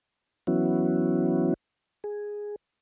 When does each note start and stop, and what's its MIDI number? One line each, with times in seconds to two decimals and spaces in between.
0.47 1.54 52
0.47 1.54 54
0.47 1.54 59
0.47 1.54 61
0.47 1.54 64
0.47 1.54 66
2.04 2.56 68